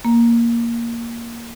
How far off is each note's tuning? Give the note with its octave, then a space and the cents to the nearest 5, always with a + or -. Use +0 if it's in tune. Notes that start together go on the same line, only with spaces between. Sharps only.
A#3 +0